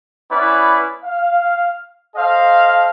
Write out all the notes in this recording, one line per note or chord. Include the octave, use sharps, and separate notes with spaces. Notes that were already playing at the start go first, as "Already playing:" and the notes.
B3 C#4 E4 B4 D5
F5
A4 C5 D#5 F5